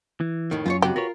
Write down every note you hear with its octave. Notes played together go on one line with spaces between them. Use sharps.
E3
F2 A2 D#3
F#2 F4 C5 C#5
C#2 C3 F#4 G4
F4 F#4 A#4 B4 C#5